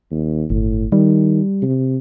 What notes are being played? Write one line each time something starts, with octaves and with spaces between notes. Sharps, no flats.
D#2
G1 A2
D#3 G3
C3